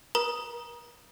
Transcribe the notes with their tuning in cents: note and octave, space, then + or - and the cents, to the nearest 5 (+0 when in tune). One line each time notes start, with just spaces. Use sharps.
A#4 +45 A#5 +30 D#6 +0